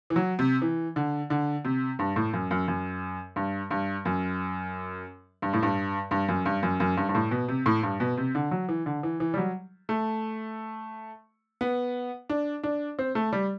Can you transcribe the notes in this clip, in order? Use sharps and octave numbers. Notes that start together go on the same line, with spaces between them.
E3
F#3
C3
E3
D3
D3
C3
G2
A2
F#2
F#2
F#2
G2
G2
F#2
G2
A2
G2
G2
F#2
G2
F#2
F#2
G2
G2
A2
B2
C3
A2
G2
B2
C3
D3
F#3
E3
D3
E3
E3
G3
F#3
A3
B3
D4
D4
C4
A3
G3